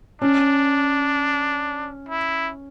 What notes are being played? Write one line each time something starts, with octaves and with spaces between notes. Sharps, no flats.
C#4 D4
E4